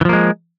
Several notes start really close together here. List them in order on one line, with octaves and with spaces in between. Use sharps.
E3 F3 A#3 G#3